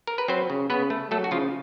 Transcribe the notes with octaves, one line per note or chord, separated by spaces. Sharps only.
A#4
B4
F#3 C4 C5
C#3
C#3 B3 B4
A3
F#3 A3 A4
F#4
C#3 F3 F4